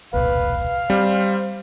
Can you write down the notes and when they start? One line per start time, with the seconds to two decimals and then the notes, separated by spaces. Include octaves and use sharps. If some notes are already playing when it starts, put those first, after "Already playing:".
0.14 E1 C2 A#2 B4 F5
0.90 G3 C4 C5